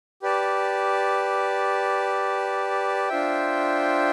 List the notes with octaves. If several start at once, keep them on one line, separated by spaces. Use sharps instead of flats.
G4 B4 D5 A5
D4 F4 C5 E5 G5